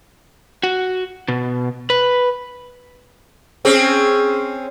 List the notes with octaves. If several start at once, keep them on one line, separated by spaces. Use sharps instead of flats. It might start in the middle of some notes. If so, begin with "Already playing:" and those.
F#4
B2
B4
C4 C#4 G#4